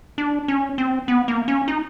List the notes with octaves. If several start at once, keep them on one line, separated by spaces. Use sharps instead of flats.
D4
C#4
C4
B3
A#3
C#4
D#4